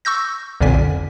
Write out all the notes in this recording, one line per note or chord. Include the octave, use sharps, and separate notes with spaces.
C#6 E6 G6 A#6
B1 F2 A#2 D3 G#5 B6